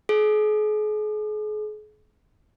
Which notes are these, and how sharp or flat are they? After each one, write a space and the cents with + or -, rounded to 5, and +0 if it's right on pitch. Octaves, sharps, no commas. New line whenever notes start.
G#4 +40